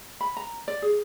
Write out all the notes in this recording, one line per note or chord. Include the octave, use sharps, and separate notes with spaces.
B5
A#5
D5
G#4